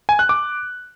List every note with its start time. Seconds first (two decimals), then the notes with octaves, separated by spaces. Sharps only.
0.09 G#5
0.19 F#6
0.29 D6